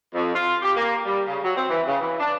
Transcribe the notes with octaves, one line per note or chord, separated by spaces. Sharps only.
F2
F4
G4
A#3
G3
C#3
F#3
C4
E3
C#3
E3
D4